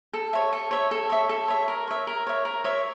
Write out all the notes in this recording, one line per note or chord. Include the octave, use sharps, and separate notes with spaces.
A4
C#5 E5
A4
C#5 E5
A4
C#5 E5
A4
C#5 E5
A#4
C#5 E5
A#4
C#5 E5
A#4
C#5 E5